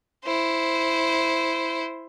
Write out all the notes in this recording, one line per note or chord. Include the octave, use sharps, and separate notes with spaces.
E4 C5